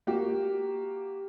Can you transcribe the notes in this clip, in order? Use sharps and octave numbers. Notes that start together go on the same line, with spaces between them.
A#3 F#4 G4